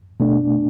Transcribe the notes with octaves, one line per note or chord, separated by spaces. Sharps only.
B2 A3 D4